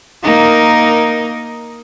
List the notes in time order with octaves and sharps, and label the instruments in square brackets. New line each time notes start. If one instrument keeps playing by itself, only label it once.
[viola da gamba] A#3 D#4 A#4